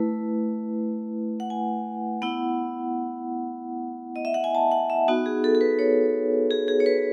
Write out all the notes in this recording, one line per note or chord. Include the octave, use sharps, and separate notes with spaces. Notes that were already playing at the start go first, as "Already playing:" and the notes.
Already playing: A3 E4 B4
F#5
G#5
B3 E4 F#5
D#5
E5
F#5
G#5
A5
F#5
E5
B3 D#4 F#4
G#4
A4
A4
B4
C#5
G#4
G#4
C#5
B4